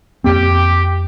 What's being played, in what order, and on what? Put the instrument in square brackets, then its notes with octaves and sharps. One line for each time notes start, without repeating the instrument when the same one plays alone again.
[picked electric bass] F2 A#3 C4 [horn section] G4